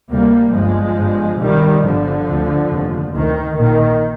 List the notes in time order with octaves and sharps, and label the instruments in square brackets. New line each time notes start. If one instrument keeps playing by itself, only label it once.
[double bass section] D2 C3 G3 A#3
G1 G2 F3 G#3
G1 G2
C2 C3 D#3 G3
G1 G2 D3 F3
D2 C3
F1 D#2
D2 C3 D#3
A#1 A#2 D#3